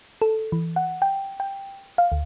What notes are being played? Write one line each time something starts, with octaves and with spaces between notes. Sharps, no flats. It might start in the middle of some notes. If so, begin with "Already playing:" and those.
A4
E3
F#5
G5
G5
F5
D2